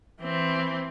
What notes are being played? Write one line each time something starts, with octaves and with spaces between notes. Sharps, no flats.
E3 C4